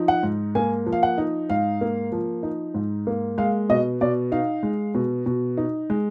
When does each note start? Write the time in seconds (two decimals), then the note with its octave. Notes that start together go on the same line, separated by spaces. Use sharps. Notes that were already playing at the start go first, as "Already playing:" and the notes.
Already playing: F3 D#4
0.08 F#5
0.23 G#2
0.55 A#3 G#5
0.86 F3
0.92 F5
1.03 F#5
1.18 D#4
1.50 G#2 F5
1.81 A#3
2.12 F3
2.43 D#4
2.74 G#2
3.07 A#3
3.38 G#3 F5
3.69 B2 D#5
4.01 B2 D5
4.32 D#4 F5
4.63 G#3
4.95 B2
5.26 B2
5.57 D#4
5.90 G#3